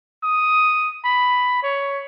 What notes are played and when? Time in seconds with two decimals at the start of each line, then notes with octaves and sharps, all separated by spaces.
0.23 D#6
1.05 B5
1.63 C#5